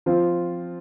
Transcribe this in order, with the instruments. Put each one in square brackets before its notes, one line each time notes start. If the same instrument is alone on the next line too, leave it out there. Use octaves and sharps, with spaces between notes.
[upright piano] F3 C4 F4